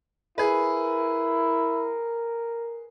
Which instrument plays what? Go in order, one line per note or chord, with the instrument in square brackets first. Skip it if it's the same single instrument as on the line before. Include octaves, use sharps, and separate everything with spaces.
[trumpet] E4 [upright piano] G#4 B4 [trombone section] A#4